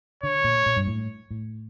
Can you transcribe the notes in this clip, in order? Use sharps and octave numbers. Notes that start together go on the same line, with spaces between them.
D3 C#5
A#2
A#2
G2
A2
A2